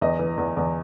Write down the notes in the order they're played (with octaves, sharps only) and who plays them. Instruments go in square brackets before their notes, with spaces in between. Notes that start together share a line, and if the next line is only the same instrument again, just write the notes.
[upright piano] E2 D#5
E3
E2
E2